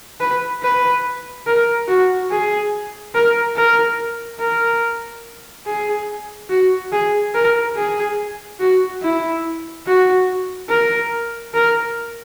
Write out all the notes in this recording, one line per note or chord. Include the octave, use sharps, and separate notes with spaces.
B4
B4
A#4
F#4
G#4
A#4
A#4
A#4
G#4
F#4
G#4
A#4
G#4
F#4
E4
F#4
A#4
A#4